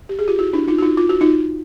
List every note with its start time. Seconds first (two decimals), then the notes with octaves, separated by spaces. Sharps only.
0.09 G4
0.19 G#4
0.28 F4 G4
0.39 E4 F#4
0.53 D4 E4
0.68 D#4 F4
0.78 F#4
0.82 D#4 F4
0.97 F4
1.09 F#4
1.21 D#4 F4